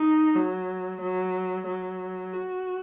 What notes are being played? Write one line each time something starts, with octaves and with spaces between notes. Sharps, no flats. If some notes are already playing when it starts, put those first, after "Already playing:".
Already playing: D#4
F#3
F#3
F#3
F#4